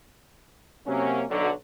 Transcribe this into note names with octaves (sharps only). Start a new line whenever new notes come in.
C3 F#3 A#3 C#4
B1 D3 F#3